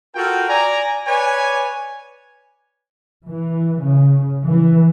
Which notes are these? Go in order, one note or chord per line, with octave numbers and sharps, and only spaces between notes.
F4 F#4 A4 A#4 F5 G5
D5 G#5 A#5
B4 C#5 D5 G#5
E3
C#3
E3